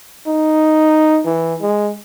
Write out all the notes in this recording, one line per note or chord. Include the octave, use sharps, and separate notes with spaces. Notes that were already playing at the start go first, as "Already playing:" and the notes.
D#4
E3
G#3